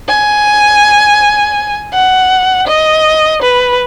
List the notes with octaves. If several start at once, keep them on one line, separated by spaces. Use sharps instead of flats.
G#5
F#5
D#5
B4